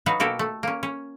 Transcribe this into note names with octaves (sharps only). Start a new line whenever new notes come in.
F#3 D#4 F#4 B4 F5
B2 A#3 F#4 G4 A4
A3
A#3 C#4
C#4